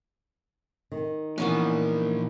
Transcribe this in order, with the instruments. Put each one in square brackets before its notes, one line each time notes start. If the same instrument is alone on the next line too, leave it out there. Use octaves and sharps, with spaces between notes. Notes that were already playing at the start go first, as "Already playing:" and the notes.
[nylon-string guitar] D#3
[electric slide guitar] A#2 F3 [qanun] E3 B3 C#4 [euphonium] A#3